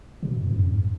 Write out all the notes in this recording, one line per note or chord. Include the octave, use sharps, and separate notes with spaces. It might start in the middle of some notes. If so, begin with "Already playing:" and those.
B2
F#2
F#2
F2
G#2